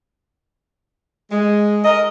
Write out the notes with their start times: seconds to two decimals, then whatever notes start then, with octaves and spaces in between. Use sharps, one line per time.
1.32 G#3
1.85 A#4 D#5